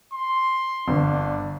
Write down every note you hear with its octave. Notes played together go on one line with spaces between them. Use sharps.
C6
G1 D4